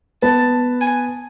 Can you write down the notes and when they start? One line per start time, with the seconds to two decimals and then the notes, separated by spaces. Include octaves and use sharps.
0.22 B3 B4 A5
0.81 G#5